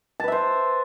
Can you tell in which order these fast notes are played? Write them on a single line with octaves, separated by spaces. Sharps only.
A5 B4 E5 C5